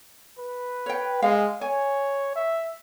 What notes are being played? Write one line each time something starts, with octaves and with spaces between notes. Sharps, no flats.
B4
C#5 G5
G#3 F5
C#5 G#5
E5